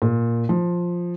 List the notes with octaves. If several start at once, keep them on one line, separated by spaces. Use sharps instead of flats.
A#2
F3